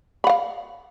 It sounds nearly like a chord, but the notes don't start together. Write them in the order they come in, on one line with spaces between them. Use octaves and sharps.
B5 F#5 F5